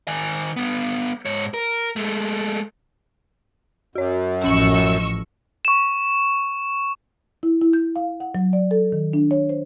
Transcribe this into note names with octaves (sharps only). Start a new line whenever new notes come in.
D#3 G#5
G3 B3
G#2 C#5
A#4
G#3 A3
F#2 F#4 C#5
A1 F3 C#4 D#5 C#6 E6 F#7
C#6 E7
E4
E4
G6
F5
F#5
F#3
D5
A4
D#3
D4
C#5
C5